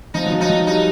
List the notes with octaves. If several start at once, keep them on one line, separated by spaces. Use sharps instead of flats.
F3 D#4
F#3
F3
D#4
F#3
G3 D#4